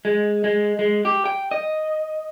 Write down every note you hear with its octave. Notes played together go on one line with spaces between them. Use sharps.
G#3
G#3
G#3
G4
G5
D#5